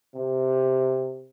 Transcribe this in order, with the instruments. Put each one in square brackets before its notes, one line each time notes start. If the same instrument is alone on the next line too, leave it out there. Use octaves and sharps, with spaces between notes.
[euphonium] C3